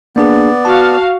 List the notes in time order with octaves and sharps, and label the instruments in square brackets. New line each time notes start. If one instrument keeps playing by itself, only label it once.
[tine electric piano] A#3 D4 G#4 [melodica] B3 D5
[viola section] F#4 F5 [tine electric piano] A5